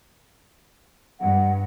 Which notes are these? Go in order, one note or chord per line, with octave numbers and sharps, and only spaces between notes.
G2 F#5